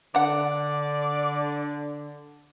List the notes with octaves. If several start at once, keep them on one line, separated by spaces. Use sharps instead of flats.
D3 D4 D5 F#5